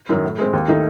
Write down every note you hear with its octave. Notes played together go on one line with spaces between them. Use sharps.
F#2 D#3 F#3
A2
G#3 C4
D#2
D#3 A3 D#4